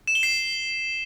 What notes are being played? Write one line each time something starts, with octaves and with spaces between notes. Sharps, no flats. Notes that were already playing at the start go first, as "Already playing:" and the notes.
E7
G7
C7